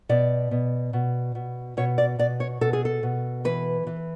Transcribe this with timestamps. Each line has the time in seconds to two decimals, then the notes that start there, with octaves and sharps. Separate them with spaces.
0.09 B2 D5
0.51 B2
0.93 B2
1.35 B2
1.77 B2 C#5
1.98 D5
2.19 B2 D5
2.40 C#5
2.61 B2 A4
2.73 G#4
2.85 A4
3.03 B2
3.45 E3 B4
3.87 E3